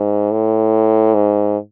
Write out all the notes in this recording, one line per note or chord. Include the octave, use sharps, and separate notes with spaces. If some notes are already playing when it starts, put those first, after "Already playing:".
Already playing: G#2
A2
G#2